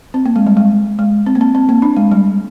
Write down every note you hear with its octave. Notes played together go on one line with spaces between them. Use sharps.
C4
A#3
G#3
G3
G#3
G#3
C4
A#3
C4
C4
A#3
D4
G#3
G3